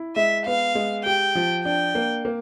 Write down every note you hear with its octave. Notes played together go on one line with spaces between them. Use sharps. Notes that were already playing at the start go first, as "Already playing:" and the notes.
Already playing: E4
G#3 E5
B3 F5
G#3
G4 G5
F3
D4 G5
A#3
A#3